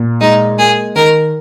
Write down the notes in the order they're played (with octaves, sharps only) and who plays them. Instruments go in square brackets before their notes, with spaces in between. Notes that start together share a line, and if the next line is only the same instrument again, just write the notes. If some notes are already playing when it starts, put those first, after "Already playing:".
Already playing: [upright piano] A#2
[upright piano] G#3 [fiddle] D#4
[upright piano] A#3 [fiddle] G#4
[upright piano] D#3 [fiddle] A#4